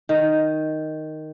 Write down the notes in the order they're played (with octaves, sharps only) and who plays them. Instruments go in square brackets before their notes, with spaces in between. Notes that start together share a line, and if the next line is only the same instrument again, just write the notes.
[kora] D#3